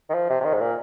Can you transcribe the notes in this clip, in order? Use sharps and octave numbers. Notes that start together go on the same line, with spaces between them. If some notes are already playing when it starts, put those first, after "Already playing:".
D#3
F3
C3
C3
D#3
G#2
A#2